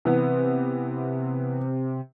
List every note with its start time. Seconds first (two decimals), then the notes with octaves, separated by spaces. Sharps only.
0.05 C3 E3 B3